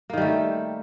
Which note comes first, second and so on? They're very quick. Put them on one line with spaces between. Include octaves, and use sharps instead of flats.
A#3 D#3 G3 A3